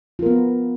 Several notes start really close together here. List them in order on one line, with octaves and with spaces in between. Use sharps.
F4 A#4 B3